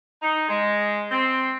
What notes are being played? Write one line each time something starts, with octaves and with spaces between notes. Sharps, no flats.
D#4
G#3
C4